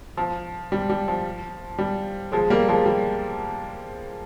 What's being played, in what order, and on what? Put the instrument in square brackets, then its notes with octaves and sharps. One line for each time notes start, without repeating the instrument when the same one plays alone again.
[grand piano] F3
G3
G3
F3
G3
F3 G#3
G3 A#3
F3 G#3
G3